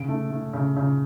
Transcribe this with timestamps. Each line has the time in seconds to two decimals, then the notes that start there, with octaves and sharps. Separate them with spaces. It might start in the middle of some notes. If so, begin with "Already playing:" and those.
Already playing: C#3 D7
0.09 A3
0.30 A3
0.53 C#3
0.77 C#3